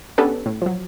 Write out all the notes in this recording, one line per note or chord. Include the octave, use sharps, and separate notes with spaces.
B3 C#4 D4 G4 A4 B4
A2
F3 F#3